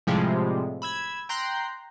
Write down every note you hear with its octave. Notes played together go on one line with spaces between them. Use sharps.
A2 C3 F3 G3 G#3
B5 E6 G#6
G5 A#5 C6 F#6 G6